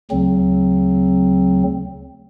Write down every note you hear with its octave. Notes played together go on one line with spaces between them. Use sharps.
D2 C#3 F#3 C4